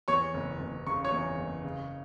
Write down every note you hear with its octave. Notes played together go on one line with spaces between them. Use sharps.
E2 C#5 C#6
F#1
F#1
C#3 C#6
C#5 C#6
E2
F#1
C#3